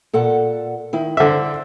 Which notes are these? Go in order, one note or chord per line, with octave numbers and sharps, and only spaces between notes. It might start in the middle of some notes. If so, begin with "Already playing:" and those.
A#2 A4 F#5
D#3 E4
D3 C5 D5 E5